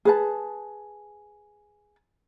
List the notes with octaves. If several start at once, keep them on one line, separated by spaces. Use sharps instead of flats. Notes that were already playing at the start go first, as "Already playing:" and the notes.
G#4 B4 A5